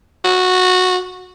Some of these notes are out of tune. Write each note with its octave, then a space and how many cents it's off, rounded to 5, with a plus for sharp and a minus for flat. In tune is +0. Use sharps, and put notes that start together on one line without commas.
F#4 -10